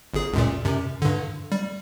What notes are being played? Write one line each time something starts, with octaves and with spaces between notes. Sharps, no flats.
G1 G#4
C#2 F#2 A#2
F#2 C3
G2 D3
G3